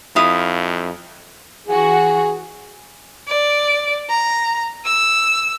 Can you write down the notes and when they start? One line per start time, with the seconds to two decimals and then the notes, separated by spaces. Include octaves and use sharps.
0.16 F2 E4 F5 D#6
1.67 E3 F#4 G#4
3.28 D5
4.09 A#5
4.85 E6